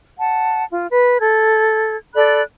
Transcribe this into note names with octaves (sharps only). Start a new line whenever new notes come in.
F#5 A5
F4
B4
A4 G#6
A4 D5 B5 F#6